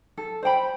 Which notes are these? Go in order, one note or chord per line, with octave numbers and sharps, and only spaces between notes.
A4
C5 G5 B5